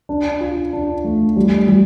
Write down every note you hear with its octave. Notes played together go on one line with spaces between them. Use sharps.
D4
F4
D4
A3
G3
G3